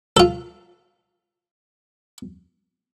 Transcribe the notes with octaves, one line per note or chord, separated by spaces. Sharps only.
F4 A4